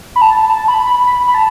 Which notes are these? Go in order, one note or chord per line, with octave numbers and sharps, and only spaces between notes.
B5
A5
A5
B5
B5
B5
B5
A5